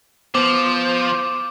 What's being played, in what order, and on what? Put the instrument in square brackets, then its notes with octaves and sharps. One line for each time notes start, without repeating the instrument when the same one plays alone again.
[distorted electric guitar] F3 [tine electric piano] B3 [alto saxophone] C5 [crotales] D6